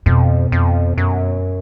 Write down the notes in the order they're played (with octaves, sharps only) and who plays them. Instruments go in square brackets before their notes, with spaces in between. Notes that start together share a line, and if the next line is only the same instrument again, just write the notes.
[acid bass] F2 [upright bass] B2
[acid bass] F2
F#2